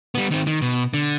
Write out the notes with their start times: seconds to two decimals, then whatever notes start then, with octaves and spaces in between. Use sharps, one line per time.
0.15 G3 B3
0.31 D#3 C4
0.47 D#3
0.62 B2
0.94 D3